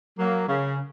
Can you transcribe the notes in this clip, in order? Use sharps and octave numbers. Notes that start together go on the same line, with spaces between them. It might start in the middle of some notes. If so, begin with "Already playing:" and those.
F#3 A#3
C#3